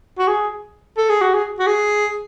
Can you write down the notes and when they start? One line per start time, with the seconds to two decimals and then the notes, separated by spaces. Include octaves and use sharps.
0.18 F#4
0.28 G#4
0.97 A4
1.09 G#4
1.21 F#4
1.34 G#4
1.59 F#4
1.67 G#4